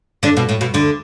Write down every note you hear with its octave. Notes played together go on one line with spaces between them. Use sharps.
D3 D4
B2
A2
B2
D2 D3